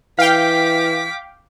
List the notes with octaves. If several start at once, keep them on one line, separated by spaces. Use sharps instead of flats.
E3 F5 G5 D6 B6